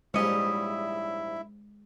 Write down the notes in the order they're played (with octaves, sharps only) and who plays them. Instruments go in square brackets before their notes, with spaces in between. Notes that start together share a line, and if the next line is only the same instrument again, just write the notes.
[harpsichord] A#1 G#2 G3 [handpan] G#3 [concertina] E4 E5 [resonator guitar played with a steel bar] C#5 D#5